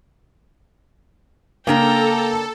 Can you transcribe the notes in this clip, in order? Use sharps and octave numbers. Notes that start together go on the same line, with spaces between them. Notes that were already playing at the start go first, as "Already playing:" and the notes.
C#3 A#3 D4 A4 A#4 G5 A#5